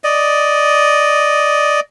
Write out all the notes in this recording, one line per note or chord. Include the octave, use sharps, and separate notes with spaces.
D5 D#5